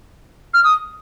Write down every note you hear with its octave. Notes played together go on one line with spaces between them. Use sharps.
F6
D#6